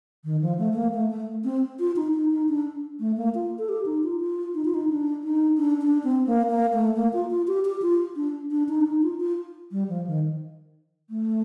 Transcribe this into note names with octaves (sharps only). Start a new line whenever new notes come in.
D#3
F3
A3
A3
A#3
A3
A3
C4
F4
D#4
D#4
D#4
D4
A3
A#3
F4
A4
G4
D#4
F4
F4
D#4
F4
D#4
D4
D#4
D4
D4
C4
A#3
A#3
A3
A#3
F4
F4
G4
G4
F4
D4
D4
D#4
D4
D#4
F4
F4
G3
F3
D#3
A3